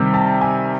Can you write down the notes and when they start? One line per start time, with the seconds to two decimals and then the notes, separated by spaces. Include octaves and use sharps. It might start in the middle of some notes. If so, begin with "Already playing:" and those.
Already playing: C3 D#3 G3
0.14 A5
0.41 G#5